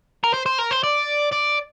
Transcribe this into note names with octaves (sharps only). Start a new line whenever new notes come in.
A#4
C5
C5
A#4
C5
D5
D5